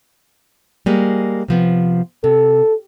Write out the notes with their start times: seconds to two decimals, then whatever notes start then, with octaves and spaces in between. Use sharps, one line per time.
0.86 G3 G#3 A#3
1.48 C3 F3 B3
2.24 C3 A4